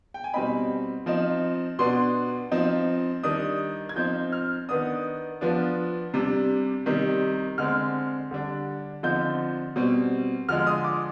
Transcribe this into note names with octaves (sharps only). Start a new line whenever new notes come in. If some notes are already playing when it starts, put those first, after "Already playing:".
G5
G#5
B2 G3 C4 D#4 B5
F3 C4 D#4
B2 B3 D4 C6
F3 C4 D#4
D#3 G3 D4 D#6
G#6
F3 C4 D#4 G6
F6
D#3 B3 D4 D#6
F3 B3 D4
C3 G3 D4
C3 D#3 G3
D3 G#3 C4 F6
D3 G3 D4
D3 F3 C4 D#4 G6
B2 G3 C4
D3 F3 G#3 F6
D#6
D6